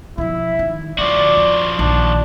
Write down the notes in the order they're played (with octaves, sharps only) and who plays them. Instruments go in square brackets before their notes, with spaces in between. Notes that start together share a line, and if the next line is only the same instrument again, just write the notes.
[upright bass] B2 F3 [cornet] E4
[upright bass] D#3
[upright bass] D3 [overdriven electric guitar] F3 F#4 [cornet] D5
[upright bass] F2
[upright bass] A#1 D#3 [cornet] D4